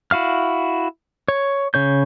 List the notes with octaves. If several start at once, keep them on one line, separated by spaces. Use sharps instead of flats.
E4 F#4 F5 F6
C#5
C#3 C#5 G6